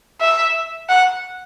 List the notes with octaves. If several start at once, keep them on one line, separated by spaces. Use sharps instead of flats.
E5
F#5